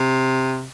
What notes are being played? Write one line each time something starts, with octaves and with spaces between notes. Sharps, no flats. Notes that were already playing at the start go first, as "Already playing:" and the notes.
Already playing: C3